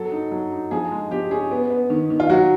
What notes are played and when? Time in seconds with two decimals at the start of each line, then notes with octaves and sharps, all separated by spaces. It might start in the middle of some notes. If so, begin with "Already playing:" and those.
Already playing: F#3 A4
0.12 D#4
0.31 F#3
0.52 D#4
0.71 F3 G#4
0.91 G#3
1.11 F3 G4
1.30 C#4 G#4
1.51 B3
1.70 B3
1.90 D#3
2.10 D#3
2.20 F4
2.29 F#3 F#4